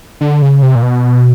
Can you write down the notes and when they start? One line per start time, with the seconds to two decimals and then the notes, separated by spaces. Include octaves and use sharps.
0.21 D3
0.42 C#3
0.62 C3
0.75 A#2
0.82 B2